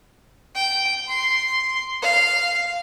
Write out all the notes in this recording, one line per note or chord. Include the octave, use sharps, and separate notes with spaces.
G5
C6
F5